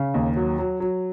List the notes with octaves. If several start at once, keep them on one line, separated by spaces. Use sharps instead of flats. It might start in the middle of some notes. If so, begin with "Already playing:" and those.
Already playing: C#3
D#2
F#3
F#3
F#3